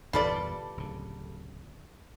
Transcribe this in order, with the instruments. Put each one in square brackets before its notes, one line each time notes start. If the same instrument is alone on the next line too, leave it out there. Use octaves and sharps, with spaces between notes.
[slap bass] G1 E2 A#2 [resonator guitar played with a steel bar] G3 A4 [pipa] F4 B4 D5
[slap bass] D1 C#3